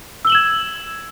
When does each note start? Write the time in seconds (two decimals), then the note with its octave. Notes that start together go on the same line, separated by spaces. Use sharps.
0.25 E6
0.27 G7
0.30 F#7
0.32 E7
0.35 G#6